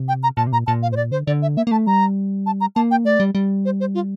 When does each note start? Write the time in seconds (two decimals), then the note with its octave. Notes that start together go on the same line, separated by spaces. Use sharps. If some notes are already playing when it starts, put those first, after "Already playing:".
Already playing: C3
0.08 G5
0.23 A#5
0.37 A#2 A5
0.47 C3
0.52 A#2 A#5
0.67 A#2 A5
0.82 F5
0.92 A2 C5
0.96 A#2 D5
1.11 D3 C5
1.27 D3 D5
1.42 E5
1.57 A#3 E5
1.67 A#3
1.71 A3 A5
1.87 G3 A#5
2.46 A5
2.61 A#5
2.76 A#3 A5
2.91 G5
3.05 A3 D5
3.20 G3
3.35 G3
3.65 C5
3.80 C5
3.95 F4